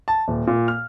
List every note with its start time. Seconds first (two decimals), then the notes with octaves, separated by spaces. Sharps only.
0.08 A5
0.28 D#1
0.47 A#2
0.68 F6